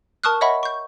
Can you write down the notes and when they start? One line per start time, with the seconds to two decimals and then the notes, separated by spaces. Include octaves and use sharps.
0.24 A#4 A5 C#6 D#6 F6 F#6
0.41 C#5 D#5 E5 F#5 B5 C#6
0.63 C#6 G6